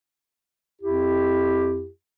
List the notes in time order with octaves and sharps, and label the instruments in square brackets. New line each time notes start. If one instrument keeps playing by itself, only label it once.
[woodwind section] F2 E4 G4